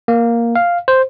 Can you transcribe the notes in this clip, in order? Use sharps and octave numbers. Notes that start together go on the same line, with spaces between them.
A#3
F5
C5